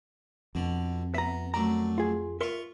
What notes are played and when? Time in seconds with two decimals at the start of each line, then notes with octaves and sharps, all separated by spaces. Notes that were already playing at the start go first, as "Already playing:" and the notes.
0.55 F2 B2 D3
1.14 B3 E5 A#5
1.54 F#2 A3 D4 A#5
1.98 F4 G#4
2.41 F4 A#4 E5 C6 C#6